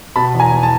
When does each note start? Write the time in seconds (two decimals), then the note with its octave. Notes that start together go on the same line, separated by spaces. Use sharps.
0.16 B2 A5 B5
0.35 E2
0.40 G#5 A#5
0.52 E2
0.63 A5